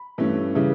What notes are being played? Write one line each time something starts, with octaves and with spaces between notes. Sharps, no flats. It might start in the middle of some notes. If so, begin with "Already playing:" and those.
Already playing: B5
G2 E3 A3 C#4
C#3 E3 G3